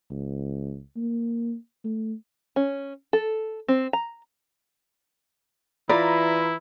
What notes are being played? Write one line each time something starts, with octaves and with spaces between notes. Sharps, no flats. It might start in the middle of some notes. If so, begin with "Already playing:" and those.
C#2
A#3
A3
C#4
A4
C4
A#5
E3 E4 F4 D5 A#5 B5